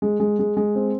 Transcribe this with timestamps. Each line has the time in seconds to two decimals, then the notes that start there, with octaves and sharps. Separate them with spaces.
0.02 G#3
0.20 G#3
0.39 G#3
0.57 G#3
0.75 C4